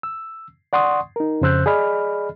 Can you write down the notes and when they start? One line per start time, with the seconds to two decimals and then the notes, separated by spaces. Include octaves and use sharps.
0.03 E6
0.73 D5 F#5 C6 C#6 D#6
1.16 D#4 A#4
1.41 F2 C#3 C5 E6 F#6 G6
1.66 G#4 D5 D#5 B5 F6